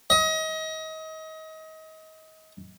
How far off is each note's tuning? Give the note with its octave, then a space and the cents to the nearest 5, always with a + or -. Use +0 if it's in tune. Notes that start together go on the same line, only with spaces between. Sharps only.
D#5 +30